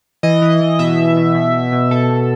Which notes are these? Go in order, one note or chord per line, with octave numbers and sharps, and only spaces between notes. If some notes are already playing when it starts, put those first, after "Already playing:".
E3 D#5
E3
E3
B2 E5
B2
B2
B2
B2
B2
B2 A4
B2